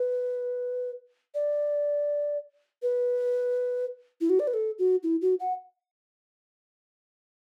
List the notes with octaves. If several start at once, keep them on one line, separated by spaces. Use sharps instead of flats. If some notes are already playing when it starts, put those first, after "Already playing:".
Already playing: B4
D5
B4
E4
F#4
D5
B4
A4
F#4
E4
F#4
F#5